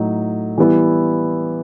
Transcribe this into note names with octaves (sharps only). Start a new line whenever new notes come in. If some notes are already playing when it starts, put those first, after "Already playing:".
Already playing: A2 F#3 A3 D#4
E3 G3 B3 E4